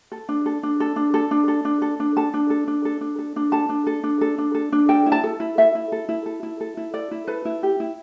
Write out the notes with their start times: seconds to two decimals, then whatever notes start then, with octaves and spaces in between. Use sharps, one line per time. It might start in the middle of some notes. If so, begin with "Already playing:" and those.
0.12 A4
0.29 D4
0.46 A4
0.63 D4
0.80 A4
0.96 D4
1.14 A4
1.31 D4
1.48 A4
1.65 D4
1.82 A4
2.00 D4
2.17 A4 A5
2.34 D4
2.50 A4
2.68 D4
2.85 A4
3.01 D4
3.19 A4
3.36 D4
3.52 A4 A5
3.69 D4
3.87 A4
4.03 D4
4.21 A4
4.38 D4
4.55 A4
4.72 D4
4.89 A4 G5
5.06 E4
5.12 A5
5.24 A4
5.40 E4
5.58 A4 E5
5.75 E4
5.92 A4
6.09 E4
6.26 A4
6.43 E4
6.60 A4
6.77 E4
6.94 A4 D5
7.11 E4
7.27 A4 B4
7.45 E4
7.63 G4
7.80 E4